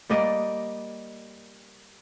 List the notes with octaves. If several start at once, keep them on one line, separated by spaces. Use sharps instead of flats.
G3 A#3 D5 D#5